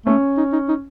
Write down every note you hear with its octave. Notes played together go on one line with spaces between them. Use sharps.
A3 C#4
D#4
D#4
D#4